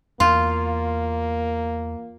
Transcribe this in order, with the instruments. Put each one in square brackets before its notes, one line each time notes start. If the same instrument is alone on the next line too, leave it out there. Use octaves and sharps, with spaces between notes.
[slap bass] E2 [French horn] A#3 [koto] F4